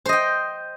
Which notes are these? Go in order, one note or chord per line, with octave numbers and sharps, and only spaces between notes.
C5 D#5 G5